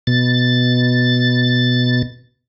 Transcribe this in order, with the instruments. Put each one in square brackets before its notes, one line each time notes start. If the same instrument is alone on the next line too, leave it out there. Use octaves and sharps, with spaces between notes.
[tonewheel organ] B2 A6